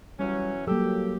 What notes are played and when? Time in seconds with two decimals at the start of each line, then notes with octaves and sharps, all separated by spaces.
0.19 E3 F#3 G3 C#4
0.67 F#3 G3 A#3 G4 A4 E6